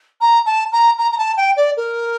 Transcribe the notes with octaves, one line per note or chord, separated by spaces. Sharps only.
A#5
A5
A#5
A#5
A#5
A5
G5
D5
A#4